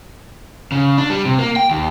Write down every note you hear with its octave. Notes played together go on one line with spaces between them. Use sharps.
C#3
D4
G3
C3
A#3
G5
D#2